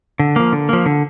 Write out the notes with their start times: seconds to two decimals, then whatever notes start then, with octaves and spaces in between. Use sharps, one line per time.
0.19 D3
0.36 F3 A#3
0.52 D3
0.69 F3 A#3
0.86 D3